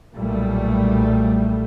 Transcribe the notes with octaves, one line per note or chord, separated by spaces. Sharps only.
B1 A#2 G3 A3